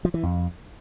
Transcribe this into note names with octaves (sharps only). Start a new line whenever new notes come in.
F3
E3
F2